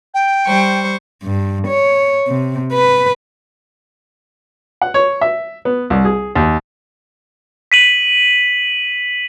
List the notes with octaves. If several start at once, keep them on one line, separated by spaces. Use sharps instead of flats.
G5
G3 C5 C#6
G2
C#5
C3
B4
F#5
C#5
E5
B3
C2
G#4
D#2
B6 D#7 F#7